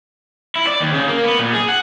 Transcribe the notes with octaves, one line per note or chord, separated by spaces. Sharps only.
E4
D5
D#2
C#3
A#3
B3
A#2
G#4
F#5